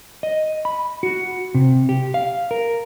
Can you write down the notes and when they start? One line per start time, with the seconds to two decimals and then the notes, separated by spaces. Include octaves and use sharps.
0.23 D#5
0.65 B5
1.03 F#4
1.55 C3
1.89 G4
2.14 F5
2.51 A#4